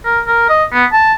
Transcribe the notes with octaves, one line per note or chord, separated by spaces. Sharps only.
A#4
A#4
D#5
B3
A5